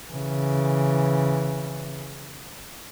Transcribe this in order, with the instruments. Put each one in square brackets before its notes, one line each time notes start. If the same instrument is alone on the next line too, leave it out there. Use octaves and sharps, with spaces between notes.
[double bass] C#3 E3